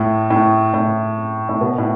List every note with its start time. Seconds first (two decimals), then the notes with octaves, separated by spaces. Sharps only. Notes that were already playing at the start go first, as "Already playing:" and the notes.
Already playing: A2
0.30 A2
0.74 A2
1.49 A2
1.61 B2
1.78 A2